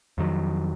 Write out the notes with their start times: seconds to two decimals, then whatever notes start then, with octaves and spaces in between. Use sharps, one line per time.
0.18 F2 D#3 F#3